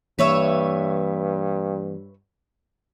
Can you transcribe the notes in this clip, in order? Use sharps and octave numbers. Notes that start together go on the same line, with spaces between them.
G2 E3 A#3 B4 C#5 E5